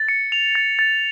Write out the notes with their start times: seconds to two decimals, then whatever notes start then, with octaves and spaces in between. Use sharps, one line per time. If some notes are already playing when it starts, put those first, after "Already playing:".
Already playing: A6
0.09 C#7
0.32 F7
0.55 A6
0.79 A6